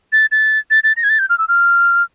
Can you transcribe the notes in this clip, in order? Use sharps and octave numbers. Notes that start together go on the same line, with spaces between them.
A6
A6
A6
A6
A#6
G#6
A6
G6
F6
E6
F6